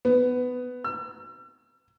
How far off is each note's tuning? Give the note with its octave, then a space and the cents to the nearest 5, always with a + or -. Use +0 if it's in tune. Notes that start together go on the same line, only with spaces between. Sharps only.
B3 +15
E6 +40